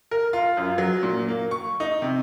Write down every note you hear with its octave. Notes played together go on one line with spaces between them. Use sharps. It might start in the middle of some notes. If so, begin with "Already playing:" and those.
A#4
F4
F#2
F#3
A#2
A#3
C#6
D#4
C3